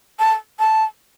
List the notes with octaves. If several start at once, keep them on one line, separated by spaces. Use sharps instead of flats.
A5
A5